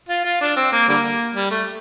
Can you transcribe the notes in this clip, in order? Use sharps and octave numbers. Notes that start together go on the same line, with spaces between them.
F4
F4
D4
C4
A#3
D3 G3 A#3
G3
A3